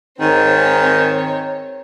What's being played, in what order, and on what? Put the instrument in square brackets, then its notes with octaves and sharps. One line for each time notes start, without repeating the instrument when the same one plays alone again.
[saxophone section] G#2 D#3 [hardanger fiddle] C4 C#5